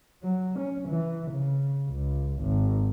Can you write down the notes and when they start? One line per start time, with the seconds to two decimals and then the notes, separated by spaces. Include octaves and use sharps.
0.23 F#3
0.59 C#4
0.88 E3
1.31 C#3
1.89 C#2
2.40 G#1